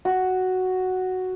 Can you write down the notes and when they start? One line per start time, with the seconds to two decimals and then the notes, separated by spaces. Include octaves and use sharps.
0.05 F#4